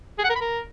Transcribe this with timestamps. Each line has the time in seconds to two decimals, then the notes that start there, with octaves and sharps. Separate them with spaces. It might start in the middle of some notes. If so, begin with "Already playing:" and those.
0.18 G#4
0.24 F#5
0.30 A#4
0.35 B5
0.41 A#4